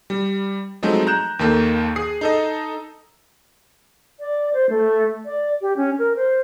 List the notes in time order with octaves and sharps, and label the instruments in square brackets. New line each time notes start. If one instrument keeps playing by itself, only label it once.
[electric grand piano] G3
F3 F#3 G#3 A3 C4 D#4
A#5 F#6 G6 E7
D#2 D#3 A#3 A4
G#4 D#6 C7
D#4 A4 D#5
[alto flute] D5
C5
A3
D5
G4
C#4
A#4
C5